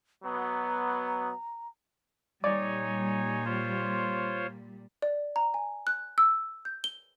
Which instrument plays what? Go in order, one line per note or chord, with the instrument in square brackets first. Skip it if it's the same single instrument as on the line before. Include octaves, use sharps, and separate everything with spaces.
[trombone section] B2 F#3 B3 [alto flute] A#5
[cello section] A#2 G3 [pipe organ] D#4 C#5 G#5 [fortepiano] D5
[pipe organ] F4 C5 C#5
[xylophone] D5
A#5
G#5
F#6
E6
G6
G7